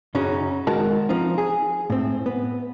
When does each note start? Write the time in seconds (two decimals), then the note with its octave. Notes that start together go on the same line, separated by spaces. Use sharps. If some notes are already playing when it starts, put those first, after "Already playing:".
0.15 F#2 C#3 F#3 C#4 D#4
0.67 D#3 G#3 F#4 A#4 A5
1.09 F3 C4 D#4
1.38 G#4
1.90 A2 C4
2.26 B3